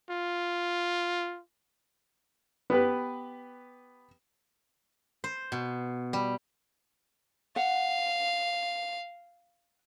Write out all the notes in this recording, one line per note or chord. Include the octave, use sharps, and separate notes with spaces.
F4
B3 G4 B4
C5
B2
G3
F5 F#5